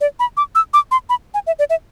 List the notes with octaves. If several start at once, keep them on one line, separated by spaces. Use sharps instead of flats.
D5
B5
D6
E6
D6
C6
B5
G#5
E5
D5
E5